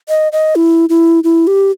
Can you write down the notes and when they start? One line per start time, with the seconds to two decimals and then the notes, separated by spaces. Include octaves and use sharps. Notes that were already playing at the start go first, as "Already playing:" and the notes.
0.09 D#5
0.32 D#5
0.56 E4
0.89 E4
1.24 E4
1.47 G4